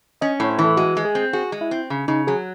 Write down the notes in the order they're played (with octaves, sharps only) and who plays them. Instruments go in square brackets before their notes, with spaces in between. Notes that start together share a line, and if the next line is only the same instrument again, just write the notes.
[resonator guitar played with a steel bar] C#4 [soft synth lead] D#5
[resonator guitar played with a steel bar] A2 [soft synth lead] C#5
[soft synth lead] C5
[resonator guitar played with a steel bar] E3
[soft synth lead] A4
[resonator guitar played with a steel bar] G#3 [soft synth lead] F#4
[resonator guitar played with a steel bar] G#3
[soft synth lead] G#4
[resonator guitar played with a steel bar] C4
[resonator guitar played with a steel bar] F#4 [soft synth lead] G#4
[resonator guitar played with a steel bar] G#3
[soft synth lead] E4
[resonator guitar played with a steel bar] C4
C#3
[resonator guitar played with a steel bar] C#3 [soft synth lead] D#4
[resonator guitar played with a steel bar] F#3 [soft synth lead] G#4